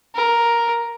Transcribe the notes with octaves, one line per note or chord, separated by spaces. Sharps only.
A#4